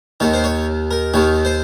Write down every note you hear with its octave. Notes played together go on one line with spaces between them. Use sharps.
D#2 D#3 C#5
C5
C#5
A#4
D#2 D#3 C#5
C5